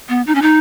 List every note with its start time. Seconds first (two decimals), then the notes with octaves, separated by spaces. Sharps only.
0.09 B3
0.27 D#4
0.35 C#4
0.42 D#4